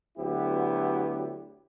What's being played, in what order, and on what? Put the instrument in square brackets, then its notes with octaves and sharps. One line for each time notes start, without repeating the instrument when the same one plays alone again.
[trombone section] D2 F#3 B3 E4 G4